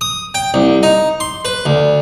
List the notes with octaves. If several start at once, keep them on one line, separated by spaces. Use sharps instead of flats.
D#6
G5
C2
D#4
C6
B4
D2